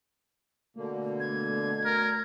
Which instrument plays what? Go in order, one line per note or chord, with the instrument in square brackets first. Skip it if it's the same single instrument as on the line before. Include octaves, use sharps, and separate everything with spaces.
[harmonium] B2 D3 A#3 [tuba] A3
[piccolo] G#6
[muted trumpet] A#4